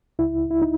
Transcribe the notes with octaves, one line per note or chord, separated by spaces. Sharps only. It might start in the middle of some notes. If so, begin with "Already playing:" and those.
C#2 E4
E4
D#4